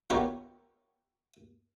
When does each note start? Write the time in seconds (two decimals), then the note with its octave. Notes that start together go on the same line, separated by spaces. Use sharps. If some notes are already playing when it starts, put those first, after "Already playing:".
0.10 D#3 B3 F4 G4 A#4 C#5